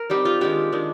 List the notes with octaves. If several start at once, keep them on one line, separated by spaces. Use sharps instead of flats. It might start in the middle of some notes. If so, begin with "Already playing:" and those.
Already playing: A#4
G3 C4 D#4 G4
F4
D#3 G#3 D4 G4
D#3 G#3 D4